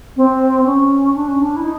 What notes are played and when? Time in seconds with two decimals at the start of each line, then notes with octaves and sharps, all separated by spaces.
0.16 C4
0.66 C#4
1.14 D4
1.28 C#4
1.41 D4
1.56 E4
1.63 D#4